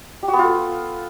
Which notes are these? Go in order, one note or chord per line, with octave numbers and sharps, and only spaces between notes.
G4
F#4
B3
F4
A4